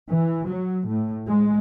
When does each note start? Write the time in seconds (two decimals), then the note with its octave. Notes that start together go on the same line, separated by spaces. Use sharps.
0.11 E3
0.47 F#3
0.87 A2
1.28 G#3